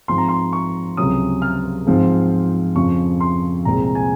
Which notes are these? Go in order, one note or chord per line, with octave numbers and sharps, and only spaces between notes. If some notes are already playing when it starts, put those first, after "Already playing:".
G#2 F3 C4 C6
A#5
C6
C#6
C#2 C3 F#3 C#4 D#6
F6
G#2 F3 C4
F2 C#3 F3 C#6
C6
C2 A#2 G#3 C4 A#5
A#5
G#5